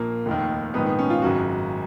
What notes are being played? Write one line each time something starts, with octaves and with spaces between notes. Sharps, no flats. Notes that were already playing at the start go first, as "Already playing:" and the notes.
Already playing: A#1 A#2 A#3
F1 D#2 D#3
A#1 G#2 D#3 B3
B3
C#4
F4
G#1 F#2 C#3 F#4